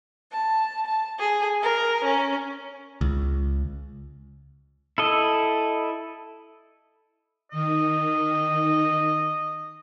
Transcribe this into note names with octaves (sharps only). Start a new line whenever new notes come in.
A5
A5
G#4
A#4
C#4
C#2
E4 A4 D#5
D#3 D#5